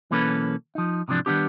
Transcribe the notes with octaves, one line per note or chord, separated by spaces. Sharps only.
B1 E3 A#3 C#4 A4 B4
F3 D#4
G#2 C3 E3 F3 D4
D#3 G3 G#3 B3 D4 G4